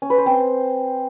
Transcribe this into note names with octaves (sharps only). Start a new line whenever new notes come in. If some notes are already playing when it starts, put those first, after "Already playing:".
C#4
B4
C5
C4